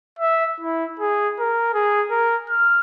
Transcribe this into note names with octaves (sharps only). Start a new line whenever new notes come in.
E5
E4
G#4
A#4
G#4
A#4
F6